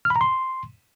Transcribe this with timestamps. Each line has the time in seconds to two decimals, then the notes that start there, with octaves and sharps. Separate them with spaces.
0.05 F6
0.10 B5
0.16 A#5
0.21 C6